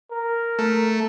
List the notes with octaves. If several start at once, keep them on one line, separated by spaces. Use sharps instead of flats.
A#4
A3